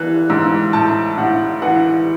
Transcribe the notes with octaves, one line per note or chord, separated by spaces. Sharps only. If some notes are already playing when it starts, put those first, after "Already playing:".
Already playing: E3 F#6
G#2 E6
A2 A5
A2 F#5
E3 F#5